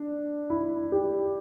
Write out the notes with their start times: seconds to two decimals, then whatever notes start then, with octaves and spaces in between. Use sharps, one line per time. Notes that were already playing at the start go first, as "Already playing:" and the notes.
Already playing: D4
0.50 E4
0.92 G4